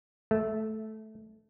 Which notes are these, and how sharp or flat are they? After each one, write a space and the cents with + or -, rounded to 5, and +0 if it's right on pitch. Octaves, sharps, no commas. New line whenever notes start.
A3 -10